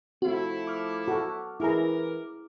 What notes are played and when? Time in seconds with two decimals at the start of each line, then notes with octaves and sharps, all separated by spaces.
0.22 F3 A3 C4 E4 F#4
0.67 D6 F6
1.08 F#4 A4
1.60 E3 E4 G#4 A#4 A#5